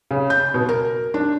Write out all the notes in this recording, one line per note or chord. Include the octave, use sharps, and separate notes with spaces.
C#3
G6
B2
A#4
D4